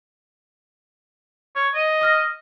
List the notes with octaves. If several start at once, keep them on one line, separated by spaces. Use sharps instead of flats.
C#5
D#5
D#6 F6 A#6